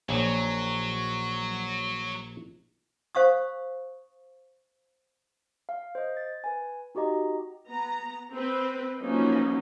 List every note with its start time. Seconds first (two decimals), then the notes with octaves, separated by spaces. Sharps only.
0.09 A#1 F#3 C#5
3.15 C5 F5 C#6 D#6
5.69 F5
5.95 C5 D#5
6.17 A6
6.44 B4 G#5
6.95 D#4 F#4 G4 D#5 A#5
7.70 B3 A#5
8.33 C4 B4
9.01 F3 F#3 A#3 B3 C#4 D#4